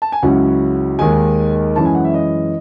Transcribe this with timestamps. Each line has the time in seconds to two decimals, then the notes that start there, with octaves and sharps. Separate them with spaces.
0.02 A5
0.12 G#5
0.23 C#2 C#3 F#3 C#4 E4 F#5
0.99 D#2 D#3 G#3 G#5
1.75 F#2 E3 G#3 C#4 E4 A5
1.85 G#5
1.95 F#5
2.04 E5
2.14 D#5